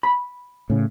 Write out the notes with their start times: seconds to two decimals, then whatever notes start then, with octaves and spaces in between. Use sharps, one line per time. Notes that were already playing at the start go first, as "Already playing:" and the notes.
0.03 B5
0.70 A2 C#3